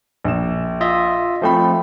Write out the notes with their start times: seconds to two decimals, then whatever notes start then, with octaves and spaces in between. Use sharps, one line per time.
0.25 A#1 E7
0.81 F4 D#5 E5
1.42 F3 A3 C4 D#5 G5 B5